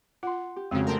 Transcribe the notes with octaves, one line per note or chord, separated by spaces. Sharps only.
F4 F#5 C6
G4
F2 C#3 G#3 C4 F#4 F5
A2 C#3 A3 C4 A4 A#4